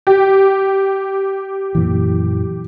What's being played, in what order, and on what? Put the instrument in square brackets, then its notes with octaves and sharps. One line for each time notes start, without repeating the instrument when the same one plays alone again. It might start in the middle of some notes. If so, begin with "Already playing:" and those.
[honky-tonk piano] G4
[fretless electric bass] F#2 A#2 E3